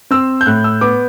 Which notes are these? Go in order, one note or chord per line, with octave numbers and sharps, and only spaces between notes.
C4 E6
G6
A2 F#6
E6
B3 D6